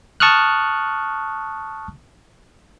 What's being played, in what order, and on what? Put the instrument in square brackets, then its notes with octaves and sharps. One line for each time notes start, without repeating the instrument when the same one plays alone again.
[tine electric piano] A5 C#6 D#6 F6 F#6